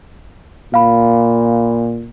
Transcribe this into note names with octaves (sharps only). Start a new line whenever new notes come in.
A#2 F5 B5